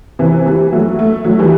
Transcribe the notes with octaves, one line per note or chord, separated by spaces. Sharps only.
C3 E3
E3 G3
F#3 A3
A3
F#3 A3
E3 G3